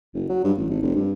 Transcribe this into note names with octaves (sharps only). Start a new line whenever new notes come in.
F#1
F#3
G2
A1
G#1
F1
G2